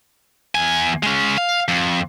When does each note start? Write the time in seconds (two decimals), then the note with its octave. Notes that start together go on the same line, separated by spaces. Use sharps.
0.55 E2 G#5
1.03 G#3 C#4
1.38 F5
1.68 F2